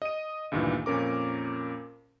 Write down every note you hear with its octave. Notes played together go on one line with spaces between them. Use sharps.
D#5 D#7
D2 G2 A#2 D#3 E3
F2 A#2 C#4 A#4 D6